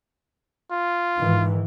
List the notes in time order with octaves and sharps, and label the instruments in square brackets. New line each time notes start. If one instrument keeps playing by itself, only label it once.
[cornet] F4
[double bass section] G#2 D#3 E3